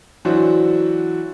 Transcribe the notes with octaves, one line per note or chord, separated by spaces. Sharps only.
E3 F#3 D4 E4 F#4 C5